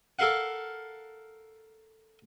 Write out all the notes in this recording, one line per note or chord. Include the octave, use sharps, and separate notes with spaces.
A4 A#4 F5 F#5